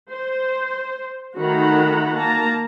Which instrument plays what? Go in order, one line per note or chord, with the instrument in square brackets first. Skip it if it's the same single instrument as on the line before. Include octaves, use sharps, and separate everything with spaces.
[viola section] C5
D#3 A3 F#4 F#5 A#5 B5
A#3 A5 A#5